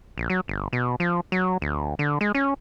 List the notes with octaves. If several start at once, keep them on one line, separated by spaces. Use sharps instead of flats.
A#1
F#3
G1
B2
F3
F#3
D2
D3
G#3
C#4